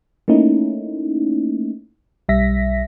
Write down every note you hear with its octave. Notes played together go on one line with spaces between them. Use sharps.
A3 A#3 C#4 D#4 E4
B1 G3 E5 A#6 B6